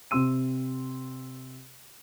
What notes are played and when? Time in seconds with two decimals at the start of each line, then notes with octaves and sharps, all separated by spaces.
0.11 C3 C4 C6 E6 D#7